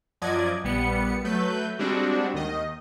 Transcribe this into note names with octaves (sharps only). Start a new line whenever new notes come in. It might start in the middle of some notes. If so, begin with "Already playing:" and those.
F#2 F3 F#3 D5 D#5 G#6
A#1 G3 B3 C#7
F#3 A3 B4 G6
G3 G#3 C4 D4 F#4
D#2 D#3 D#5